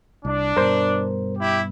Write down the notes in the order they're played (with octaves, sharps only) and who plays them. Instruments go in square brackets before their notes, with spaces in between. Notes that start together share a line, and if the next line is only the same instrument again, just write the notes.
[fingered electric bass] C2 [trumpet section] D4
[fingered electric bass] G2 B2 [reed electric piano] A#4 C5
[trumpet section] E4 G4